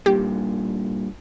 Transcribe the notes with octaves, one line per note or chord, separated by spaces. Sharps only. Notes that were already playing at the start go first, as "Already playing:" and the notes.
G2 A#2 G4